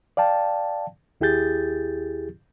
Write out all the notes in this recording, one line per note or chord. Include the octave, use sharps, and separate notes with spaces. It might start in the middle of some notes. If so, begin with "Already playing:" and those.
D5 F5 G5 A5
D#2 E4 G4 G#4 G6 A6